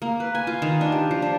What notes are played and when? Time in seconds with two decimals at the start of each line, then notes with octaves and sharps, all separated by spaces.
0.02 A#3
0.20 B4
0.35 G#5
0.47 F4
0.62 D#3
0.81 D4
0.92 G4
1.11 F3
1.22 D4